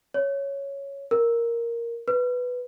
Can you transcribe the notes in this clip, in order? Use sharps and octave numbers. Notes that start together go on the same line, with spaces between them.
C#5
A#4
B4